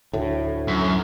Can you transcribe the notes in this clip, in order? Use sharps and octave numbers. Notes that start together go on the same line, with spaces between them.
D2 A2
F#2